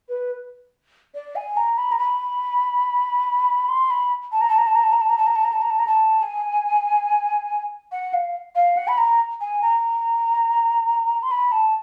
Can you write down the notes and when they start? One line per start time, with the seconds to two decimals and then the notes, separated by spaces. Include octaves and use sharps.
0.09 B4
1.14 D5
1.36 G#5
1.57 A#5
1.78 B5
1.92 A#5
1.99 B5
3.68 C6
3.90 B5
4.32 A5
4.41 A#5
4.50 A5
4.58 A#5
4.67 A5
4.75 A#5
4.83 A5
4.92 A#5
5.01 A5
5.09 A#5
5.18 A5
5.27 A#5
5.35 A5
5.44 A#5
5.53 A5
5.62 A#5
5.70 A5
5.79 A#5
5.87 A5
6.22 G#5
7.92 F#5
8.13 F5
8.55 F5
8.77 F#5
8.88 B5
8.98 A#5
9.41 G#5
9.62 A#5
11.23 C6
11.31 B5
11.52 A5